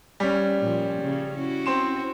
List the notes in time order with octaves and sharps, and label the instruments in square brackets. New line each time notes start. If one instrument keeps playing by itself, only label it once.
[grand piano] G3 C#4
[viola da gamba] A#2 F3
C#3
C#4 E4 F#4
[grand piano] C4 C6 E7